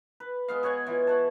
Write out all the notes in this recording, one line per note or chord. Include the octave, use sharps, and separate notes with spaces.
B4
G#3 B3 F5
B2 C#5 F#5 G#5
E3 F4
C#5 F#5 A5